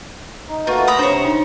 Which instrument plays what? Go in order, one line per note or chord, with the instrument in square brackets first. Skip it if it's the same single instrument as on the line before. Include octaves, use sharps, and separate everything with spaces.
[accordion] D#4
[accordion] A3 A#3 F#4 [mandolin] F4 [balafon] B4 C#6
[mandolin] A#5 B5 D#6
[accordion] C3 [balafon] D4 [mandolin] C5 C#5
[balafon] D#4